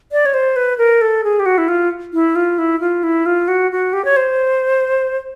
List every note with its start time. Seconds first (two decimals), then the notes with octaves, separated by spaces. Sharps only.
0.12 D5
0.26 C#5
0.34 C5
0.56 B4
0.78 A#4
1.01 A4
1.24 G#4
1.40 G4
1.46 F#4
1.58 E4
1.68 F4
2.13 E4
2.36 F4
2.58 E4
2.81 F4
3.03 E4
3.26 F4
3.48 F#4
3.72 F#4
3.93 G4
4.05 C#5
4.17 C5